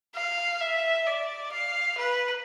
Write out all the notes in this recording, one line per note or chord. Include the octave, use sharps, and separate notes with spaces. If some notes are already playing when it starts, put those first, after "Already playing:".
F5
E5
D5
F5
B4